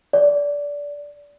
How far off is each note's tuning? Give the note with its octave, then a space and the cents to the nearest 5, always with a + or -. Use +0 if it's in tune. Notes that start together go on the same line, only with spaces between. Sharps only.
D5 -20